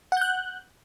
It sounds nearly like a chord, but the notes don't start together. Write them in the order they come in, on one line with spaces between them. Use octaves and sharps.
F#5 G6 F#6